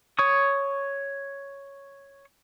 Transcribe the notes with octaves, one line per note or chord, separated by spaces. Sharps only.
C#5 C#6 D#6